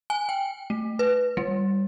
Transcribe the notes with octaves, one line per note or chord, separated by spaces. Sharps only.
G#5
G5
A3
B4
G3